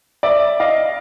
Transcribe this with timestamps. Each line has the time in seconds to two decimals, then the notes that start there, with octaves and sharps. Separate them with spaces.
0.23 D5 E5
0.60 D#5 F5